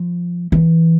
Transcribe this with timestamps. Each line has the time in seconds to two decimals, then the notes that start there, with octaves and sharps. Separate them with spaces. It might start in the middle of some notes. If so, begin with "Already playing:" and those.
Already playing: F3
0.52 E3